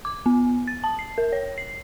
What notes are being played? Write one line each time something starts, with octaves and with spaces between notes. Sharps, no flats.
D6
B3
A6
A5
C7
A#4
C#5
C7